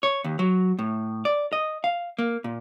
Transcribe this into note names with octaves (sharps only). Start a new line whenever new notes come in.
C#5
D#2
F#3
A2
D5
D#5
F5
A#3
A#2